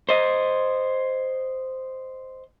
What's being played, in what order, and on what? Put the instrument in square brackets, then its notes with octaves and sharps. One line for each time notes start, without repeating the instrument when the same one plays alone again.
[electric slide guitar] C5 D#5